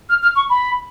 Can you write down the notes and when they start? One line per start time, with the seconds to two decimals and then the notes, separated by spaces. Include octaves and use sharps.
0.09 F6
0.22 F6
0.36 C#6
0.50 B5